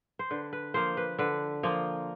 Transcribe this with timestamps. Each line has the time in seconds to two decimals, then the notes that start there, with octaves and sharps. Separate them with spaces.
0.19 C5
0.30 D3 B4
0.53 B4
0.74 F3 A#3 C5
0.97 B4
1.19 D3 B4
1.63 F3 A#3